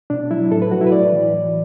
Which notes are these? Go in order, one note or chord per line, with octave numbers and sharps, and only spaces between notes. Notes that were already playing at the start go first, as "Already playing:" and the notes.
B2 D4
F#3 E4
A2 A4
B4
F#3 F#4
E4
B4
A2 D5
E3
A2